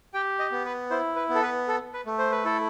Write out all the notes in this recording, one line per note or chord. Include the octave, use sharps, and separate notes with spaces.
G4 G5
D#5
B3
B4
E4 C5
B4
B3
A4
B4
A4
B4
A3
C5
B4
E4 A4